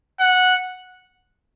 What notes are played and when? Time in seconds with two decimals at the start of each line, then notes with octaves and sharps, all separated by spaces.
0.20 F#5